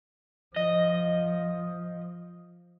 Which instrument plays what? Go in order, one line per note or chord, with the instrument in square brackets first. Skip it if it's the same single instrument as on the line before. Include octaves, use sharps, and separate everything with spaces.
[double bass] F3 [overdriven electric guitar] D#5